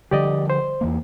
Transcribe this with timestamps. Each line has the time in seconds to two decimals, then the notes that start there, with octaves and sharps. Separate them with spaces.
0.11 D3 F3 G3 G4 D5 D#5
0.50 C5
0.81 E2 E3 A#3